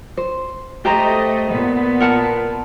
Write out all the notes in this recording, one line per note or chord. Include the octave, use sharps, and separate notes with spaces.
C5
A3 G4 C5 D#5 A#5
A#2 B3
A#4 F#5 A5